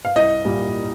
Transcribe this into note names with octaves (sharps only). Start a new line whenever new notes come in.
F5
C2 D#5
A#2 G3 A#3